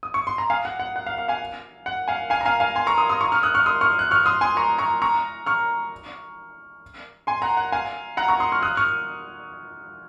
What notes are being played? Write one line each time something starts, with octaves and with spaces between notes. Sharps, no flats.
D#6
C#6
C6
A#5
F5 G#5
F#5
F#5
F#5
F5
F5
F5 G#5
F#5
F5 G#5
F5 G#5
A#5
F5 G#5
F5 G#5
G#5 C6
A#5 C#6
C6 D#6
C6 D#6
A#5 C#6
C#6 F6
D#6 F#6
C#6 F6
C6 D#6
C#6 F6
F#6
C#6 F6
C6 D#6
G#5 C6
A#5 C#6
A#5 C#6
A#5 C#6
C#6 F6
G#5 C6
F#5 A#5
F#5
F5 G#5
F#5 A#5
A#5 C#6
C6 D#6
C#6 F6
D#6 F#6
C#6 F6